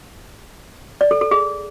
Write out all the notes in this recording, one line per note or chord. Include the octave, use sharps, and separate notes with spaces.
D5
A4
A4
G#4